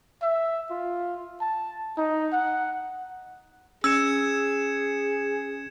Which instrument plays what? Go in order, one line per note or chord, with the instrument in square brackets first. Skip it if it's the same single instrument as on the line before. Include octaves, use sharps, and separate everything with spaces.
[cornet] E5
F4
A5
D#4
F#5
[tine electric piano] C#4 [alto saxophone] G#4 [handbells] E6 [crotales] G#6 C#7 E7